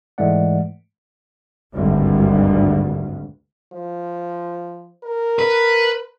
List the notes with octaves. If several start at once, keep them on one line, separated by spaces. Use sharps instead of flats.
G#2 E3 G#3 A3 D5 F#5
G#1 D2 G2
F3
A#4
B4